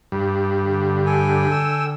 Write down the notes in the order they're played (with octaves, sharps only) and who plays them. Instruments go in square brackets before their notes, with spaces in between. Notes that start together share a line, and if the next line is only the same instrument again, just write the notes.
[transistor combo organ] G2
[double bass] D3
[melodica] A4 G5 G#5
[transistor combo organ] E6